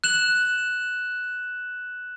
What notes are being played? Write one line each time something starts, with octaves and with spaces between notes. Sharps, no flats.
F#6 E7 F#7